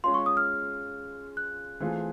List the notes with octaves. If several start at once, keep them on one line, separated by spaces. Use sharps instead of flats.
G#3 C#4 F4 C6
C#6
D#6
F6
F#6
E3 A3 C4 F4 G#4